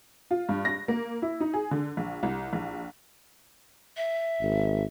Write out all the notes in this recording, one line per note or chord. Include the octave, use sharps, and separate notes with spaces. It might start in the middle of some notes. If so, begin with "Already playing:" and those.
F4
G2
A#6
A#3
E4
D#4
G#4
D3
A#1
C2
A#1
E5
G#1